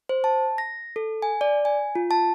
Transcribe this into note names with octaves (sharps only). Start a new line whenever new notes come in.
C5
A5
A#6
A4
G#5
D5
G#5
F4
A5